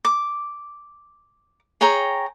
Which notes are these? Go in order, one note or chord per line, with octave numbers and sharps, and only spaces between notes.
D6
G#4 C#5 G5 A#5